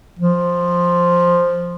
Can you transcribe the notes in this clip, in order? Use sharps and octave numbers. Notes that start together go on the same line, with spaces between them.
F3